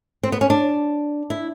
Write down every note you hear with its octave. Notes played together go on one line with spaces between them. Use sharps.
C4
B3
C#4
D4
E4